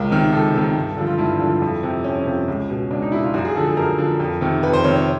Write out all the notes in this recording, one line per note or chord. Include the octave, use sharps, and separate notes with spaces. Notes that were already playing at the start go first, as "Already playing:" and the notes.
Already playing: C#2 A#4
C3 D#3
C#2 A4
C3 D#3
G2
D3 F3
F4
G2 E4
D3 F3
F2
C3 F3
F2 C#4
C3 F3
C#2
B2
C#2 D4
D#4
B2 E4
F4
F#2 F#4
G#4
D3 F3 A4
G#4
F#2 A#4
D3 F3
F2
C3 D#3
F2 B4
C5
C3 D#3 C#5
C#5